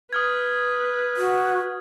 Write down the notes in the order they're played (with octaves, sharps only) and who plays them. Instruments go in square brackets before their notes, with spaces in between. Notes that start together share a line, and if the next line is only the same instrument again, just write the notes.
[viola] B4 [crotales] D#6 F6 G#6
[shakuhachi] F#4